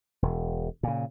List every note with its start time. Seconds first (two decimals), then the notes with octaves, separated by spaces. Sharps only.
0.22 E1
0.83 A#2 C#3